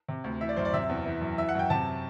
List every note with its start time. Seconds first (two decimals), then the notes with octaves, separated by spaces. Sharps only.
0.08 C3
0.24 D2
0.41 E3 E5
0.49 D5
0.57 F#2 C5
0.65 D5
0.73 C3 E5
0.89 E2
1.05 E3
1.21 F#2
1.38 E3 E5
1.49 F#5
1.55 F#2 G5
1.70 C3 A5